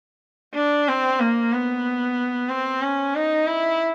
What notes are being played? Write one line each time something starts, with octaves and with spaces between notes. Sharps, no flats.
D4
C4
A#3
B3
C4
C#4
D#4
E4